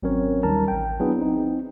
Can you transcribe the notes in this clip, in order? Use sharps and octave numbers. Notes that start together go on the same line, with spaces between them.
G#1 F#3 C4 C#4 A#4 C#5
D#2 D#3 G3 A#4 A5 A#5
A1 G5
F#3 B3 D4 E4 G#4 B4
C4 D#4